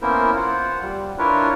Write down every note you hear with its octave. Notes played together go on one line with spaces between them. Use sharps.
A#3 B3 C#4 E4 A#4 C5
F4 C5 F#5
G3
D4 E4 F4 A#4 B4 C#5